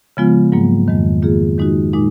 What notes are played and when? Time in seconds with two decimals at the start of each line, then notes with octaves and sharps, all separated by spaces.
0.17 C#3 F3 G#3 B3 F4
0.52 G#2 F#3 A#3
0.88 F2 D#3 G#3
1.23 D#3 A#3 F4 G#4
1.58 D#3 G#3 D#4 F#4
1.94 A#2 G#3 D#4